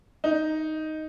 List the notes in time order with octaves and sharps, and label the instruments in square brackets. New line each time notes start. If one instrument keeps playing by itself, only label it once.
[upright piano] D#4